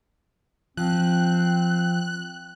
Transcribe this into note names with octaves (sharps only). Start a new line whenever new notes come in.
F3 C4 F#6